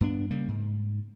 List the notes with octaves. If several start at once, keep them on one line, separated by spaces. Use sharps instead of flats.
G2 B3 D4
C#3 G3 A#3
G#2